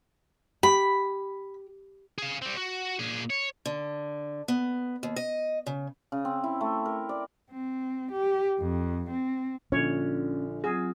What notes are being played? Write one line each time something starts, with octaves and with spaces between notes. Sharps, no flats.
G4 B5
G#4 F5
G3 C4
F#4
A#2 G#4
C#5
D3
B3
D#2
D#5
C#3
C#3
C4
E4
A3
A#4
D5
C4
G4
F2
C4
A#1 D3 C#4 F4 C#5
F#3 C4 F4 G#4